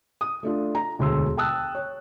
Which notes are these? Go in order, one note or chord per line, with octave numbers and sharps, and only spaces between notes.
D#6
A3 D4 F4
A#5
E1 D2 G#4 C6 E6
G5 A5 D#6 E6 F#6
C#5